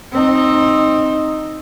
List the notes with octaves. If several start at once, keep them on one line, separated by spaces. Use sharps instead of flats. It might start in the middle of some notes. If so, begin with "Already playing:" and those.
C4 D#4